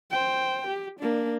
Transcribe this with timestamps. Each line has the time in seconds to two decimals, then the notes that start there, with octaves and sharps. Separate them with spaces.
0.10 C5 G5
0.67 G4
1.00 A#3 D4